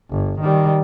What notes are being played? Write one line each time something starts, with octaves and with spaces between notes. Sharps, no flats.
G1
D#3 G3